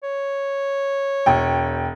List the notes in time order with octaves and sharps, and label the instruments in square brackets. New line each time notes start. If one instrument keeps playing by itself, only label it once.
[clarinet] C#5
[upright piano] E1 G5